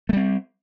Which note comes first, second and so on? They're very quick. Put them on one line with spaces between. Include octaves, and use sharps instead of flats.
A3 G3 C4